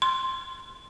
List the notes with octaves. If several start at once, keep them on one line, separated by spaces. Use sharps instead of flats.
C6